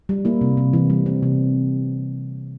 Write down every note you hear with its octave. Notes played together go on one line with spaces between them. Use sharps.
G3
A#3 E4
C3
C3
E3
G3
C4
C3